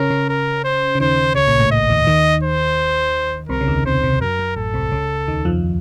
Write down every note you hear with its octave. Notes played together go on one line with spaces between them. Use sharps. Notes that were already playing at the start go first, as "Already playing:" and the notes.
Already playing: C#3 C#4 A#4
C#3 C#4
A#4
C5
C#3
D#2 D#3 C5
C#2 C#3 C#5
A#1 A#2
A1 A2
D#5
D#2 D#3
D#2 D#3
C5
C2 C3 A#4
C#3
D#2 D#3
C2 C3 C5
C2 C3
F#2 A#4
F#2
A1 A2 A4
C2 C3
C#2 C#3
D#2 D#3
F2 F3